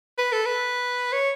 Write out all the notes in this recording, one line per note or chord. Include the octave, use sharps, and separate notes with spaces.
B4
A4
B4
C#5